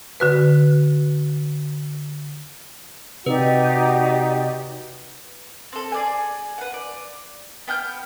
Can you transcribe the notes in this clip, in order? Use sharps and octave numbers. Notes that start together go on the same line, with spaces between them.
D3 F#4 B4
C3 D#4 F#4 G4 B4 D5
C4 A4
G#4 D5 G#5
B4 F#5
D5
B3 G5 F6 G6